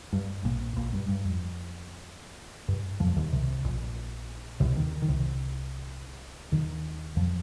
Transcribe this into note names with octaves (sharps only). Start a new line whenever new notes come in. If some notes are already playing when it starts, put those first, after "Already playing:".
G2
A#1 A#2
A#1 A#2
G2
G2
F2
G2
F2 F3
D#2 D#3
C2 C3
A#1 A#2
C2 C3
D#2 D#3
D#3
C2 C3
D#2 D#3
F2 F3